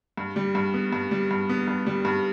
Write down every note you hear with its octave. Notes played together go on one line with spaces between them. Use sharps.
G2
G3
G2
B3
G2
G3
G2
B3
G2
G3
G2